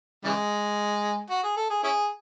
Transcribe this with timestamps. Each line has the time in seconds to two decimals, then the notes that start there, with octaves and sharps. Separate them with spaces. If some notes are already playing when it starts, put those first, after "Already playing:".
0.24 C#3 E3 G#3
1.30 F#4
1.43 G#4
1.57 A4
1.70 G#4
1.83 C#4 E4 G#4